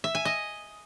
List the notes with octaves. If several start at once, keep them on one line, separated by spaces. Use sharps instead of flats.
E5
G#5
D#5